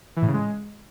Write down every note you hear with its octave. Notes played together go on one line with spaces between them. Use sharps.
E3
A2
C#3
G#3